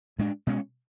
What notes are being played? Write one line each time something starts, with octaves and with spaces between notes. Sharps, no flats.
A2 G#3 D4
B2 G#3 C#4